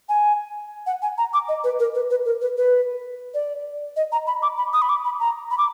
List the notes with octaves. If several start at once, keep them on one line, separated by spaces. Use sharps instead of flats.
G#5
F#5
G#5
A#5
D6
D#5
B4
A#4
B4
B4
A#4
B4
B4
D5
D#5
A#5
B5
D6
B5
D#6
B5
D6
B5
A#5
B5
D6